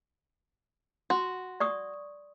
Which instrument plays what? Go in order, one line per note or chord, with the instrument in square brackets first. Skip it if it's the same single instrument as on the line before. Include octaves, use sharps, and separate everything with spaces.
[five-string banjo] F#4 [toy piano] C6
[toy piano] D5 C#6 D#6